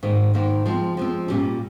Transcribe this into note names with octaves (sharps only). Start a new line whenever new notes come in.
G#2 D#3 A#3
G#2 D#3 A#3
F3 G#3 C4
F3 G#3 C4
A#2 G3 C#4